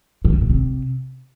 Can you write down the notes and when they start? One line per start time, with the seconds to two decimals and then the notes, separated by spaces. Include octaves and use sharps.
0.25 G#2
0.33 G2
0.41 A#2
0.50 C3